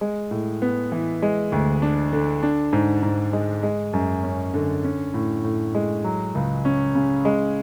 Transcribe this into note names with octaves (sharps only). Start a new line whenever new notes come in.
G#3
A2
B3
E3
G#3
D2
D4
D3
D4
G#2
G#2
G#3
G#3
F#2
C#4
D3
C#4
A2
A2
G#3
F#3
C#2
C#4
C#3
G#3